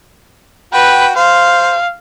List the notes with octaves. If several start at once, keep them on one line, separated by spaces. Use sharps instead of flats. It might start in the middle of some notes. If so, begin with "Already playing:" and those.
F#4 B4 G5
C5 F5